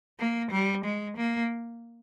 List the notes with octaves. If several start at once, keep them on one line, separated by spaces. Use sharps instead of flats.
A#3
G3
G#3
A#3